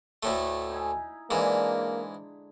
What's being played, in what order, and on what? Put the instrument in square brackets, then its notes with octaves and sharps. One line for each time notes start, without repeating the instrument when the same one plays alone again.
[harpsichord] D2 A2 A3
[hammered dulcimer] D#4 E4 G#5
[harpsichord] G#2 E3 [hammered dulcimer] D3 G#3 [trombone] A#3